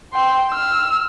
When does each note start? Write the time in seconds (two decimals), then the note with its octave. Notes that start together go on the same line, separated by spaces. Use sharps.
0.13 G5 C6
0.50 E6 F6